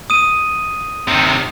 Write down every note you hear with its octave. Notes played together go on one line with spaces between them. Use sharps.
D#6 D#7
C3 D#3